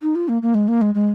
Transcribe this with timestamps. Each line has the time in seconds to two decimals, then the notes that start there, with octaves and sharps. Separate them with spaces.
0.03 D#4
0.15 F4
0.28 A#3
0.42 A#3
0.54 G#3
0.68 A#3
0.81 G#3
0.94 G#3